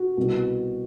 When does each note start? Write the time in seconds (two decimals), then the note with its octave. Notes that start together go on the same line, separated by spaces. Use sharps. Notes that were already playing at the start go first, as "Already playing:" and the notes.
Already playing: F#4
0.17 C2 B2